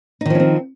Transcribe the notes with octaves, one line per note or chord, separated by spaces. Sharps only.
D#3 F3 C4 C#4 D#4